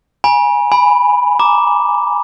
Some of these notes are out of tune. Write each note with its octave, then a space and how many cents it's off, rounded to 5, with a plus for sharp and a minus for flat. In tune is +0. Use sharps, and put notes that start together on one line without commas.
G#5 -10 B5 -40
G#5 +0 B5 +0
A#5 +0 D6 +0